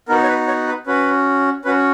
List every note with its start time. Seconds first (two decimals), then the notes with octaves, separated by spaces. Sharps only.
0.08 B3 D#4 F#4 A#4
0.23 C#5
0.28 B4
0.48 C#5
0.68 B4
0.87 C#4 F#4 B4
1.65 C#4 F#4 B4